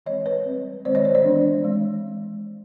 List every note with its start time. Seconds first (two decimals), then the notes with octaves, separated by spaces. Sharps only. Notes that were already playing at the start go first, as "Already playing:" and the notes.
0.06 E3 G#3 C4 C#5 D#5
0.26 B4 C#5
0.46 G3 C4
0.85 D#3 G#3 C4 C5 D5
0.95 C#5 D#5
1.04 C5 D5
1.15 C5 D5
1.24 E3 G#3 B3 D4
1.64 E3 G#3 C4